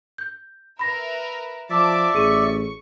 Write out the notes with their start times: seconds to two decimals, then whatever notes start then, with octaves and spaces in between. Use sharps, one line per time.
0.18 G6
0.79 A#4 B4 E5 B5 A#6
1.70 F3 D5 E5 A5 D6
2.14 A1 G#4 C#6 D#7